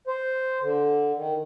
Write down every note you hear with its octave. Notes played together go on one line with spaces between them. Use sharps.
C5
D3
D#3